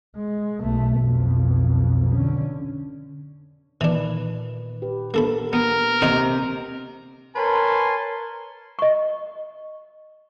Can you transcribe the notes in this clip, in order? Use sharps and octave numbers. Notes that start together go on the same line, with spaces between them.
G#3
B1 A3
B1 F2
D3 C#4
A#2 D#3 E3 D4 B4
G4 B4
A#3 B3 D4 A4 A#4 B5
A#3 B3 A#4
C3 D#4 F#4 C5
A#4 B4 C#5 G#5 A5 C6
D#5 C#6